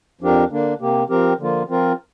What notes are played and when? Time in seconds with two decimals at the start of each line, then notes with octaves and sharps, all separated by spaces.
0.21 F2 F3 D4 G4 A#4
0.50 D3 A#3 D4
0.81 C3 A#3 G4
1.09 F3 C4 G4 A#4
1.39 D3 F3 A#3 F4
1.69 F3 C4 F4 A#4